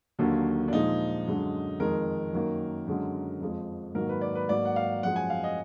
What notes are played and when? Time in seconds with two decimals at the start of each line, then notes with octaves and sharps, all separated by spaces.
0.19 D#2 D3 F#3 A#3
0.68 D4
0.72 A#2 F3 G#3 D#4
1.27 F#2 D3 G#3
1.80 F2 D#3 G#3 A#4
2.33 F#2 D#3 A#3
2.87 F#2 D3 G#3
3.41 F2 F3 G#3
3.95 G#2 D#3 F#3 A#3 A#4
4.09 B4
4.21 D5
4.35 B4
4.49 G#2 F#3 A#3 D5
4.65 F#5
4.76 F5
5.03 F#2 F3 G#3 F#5
5.16 G#5
5.30 F5
5.44 D#5